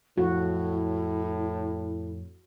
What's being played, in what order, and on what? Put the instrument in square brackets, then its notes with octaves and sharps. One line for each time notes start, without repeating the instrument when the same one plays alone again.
[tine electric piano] F2 [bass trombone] A2 [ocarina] E4 [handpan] F#4